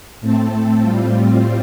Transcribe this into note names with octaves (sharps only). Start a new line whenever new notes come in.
A2 A3 C4 A4
A2 G3 C4 F4